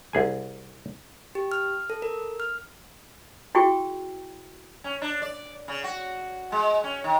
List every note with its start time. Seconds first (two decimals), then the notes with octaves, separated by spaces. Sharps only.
0.13 C2 G#4 G#5
1.35 G4
1.52 F6
1.90 A4
2.02 A#4
2.40 F6
3.55 E4 F#4 G#4 G5 C#6
4.84 C#4
5.02 D4
5.22 D5
5.68 C#3
5.84 F#4
6.52 G#3
6.84 C#4
7.04 D#3